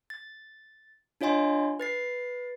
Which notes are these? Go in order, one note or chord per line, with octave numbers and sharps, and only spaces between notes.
A6
D4 F4 C#5 D#5 G#5 C6
B4 A6 C7